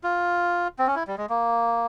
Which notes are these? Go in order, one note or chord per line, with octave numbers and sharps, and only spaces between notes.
F4
C4
C#4
E4
G3
G#3
A#3